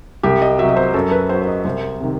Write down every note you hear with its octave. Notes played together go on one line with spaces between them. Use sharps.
C2 G4
D#5
C3 F#3 E5
D#5
C5
F#2 A4
B4
F#3 C5
C5
D#5
C2 C5
C3 D#3